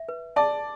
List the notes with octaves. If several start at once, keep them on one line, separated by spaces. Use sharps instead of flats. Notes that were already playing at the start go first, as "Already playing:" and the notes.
Already playing: E5
B4
D5 A5